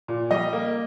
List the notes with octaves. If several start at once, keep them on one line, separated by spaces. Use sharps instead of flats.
A#2
G3 D#5
A#3